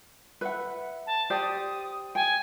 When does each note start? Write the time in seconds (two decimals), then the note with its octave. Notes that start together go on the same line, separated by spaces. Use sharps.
0.41 B4 E5 F#5
1.06 A5
1.30 G4 C5 D5 D#6
2.15 G5 G#5